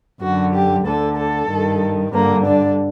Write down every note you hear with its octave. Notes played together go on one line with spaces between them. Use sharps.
F#2 D3 F#4
G4
D2 D3 A4
A4
G2 D#3
G2 D3 A#3
D4